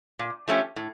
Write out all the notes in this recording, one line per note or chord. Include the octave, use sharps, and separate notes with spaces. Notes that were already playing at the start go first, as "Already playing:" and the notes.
A#2
F3 A3 C#4 G4
A2